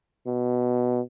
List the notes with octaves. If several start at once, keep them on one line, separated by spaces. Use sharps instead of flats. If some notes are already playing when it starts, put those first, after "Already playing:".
B2